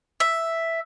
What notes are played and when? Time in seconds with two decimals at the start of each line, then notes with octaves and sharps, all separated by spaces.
0.20 E5